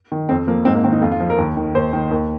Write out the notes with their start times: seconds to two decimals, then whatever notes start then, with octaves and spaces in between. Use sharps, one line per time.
0.12 D#3
0.29 F2 C4
0.47 F3 A#3
0.65 G#2 C4
0.75 A#3
0.84 D#3 C4
0.92 D#4
1.02 F2 F4
1.12 F4
1.20 F3
1.30 A#4
1.38 D#2
1.57 D#3
1.75 D#2 C5
1.93 D#3
2.11 D#2